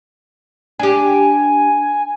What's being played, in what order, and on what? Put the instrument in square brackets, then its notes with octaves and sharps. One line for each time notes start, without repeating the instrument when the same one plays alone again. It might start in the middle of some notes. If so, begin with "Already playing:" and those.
[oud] D4 G4 [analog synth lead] G#5